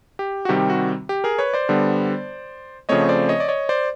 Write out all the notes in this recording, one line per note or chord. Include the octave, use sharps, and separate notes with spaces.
G4
F#4
C3 D#3 G3 C4 G4
F#4
G4
G#4 A#4
B4 C#5
C5 D5
D3 G3 B3
C#3 F3 A3 C4 C#5 D#5
C5 D5
C#5 D#5
D5
C#5 D#5
C5 D5